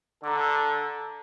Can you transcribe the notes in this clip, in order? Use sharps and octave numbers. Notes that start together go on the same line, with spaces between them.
D3 A4 A#5 D6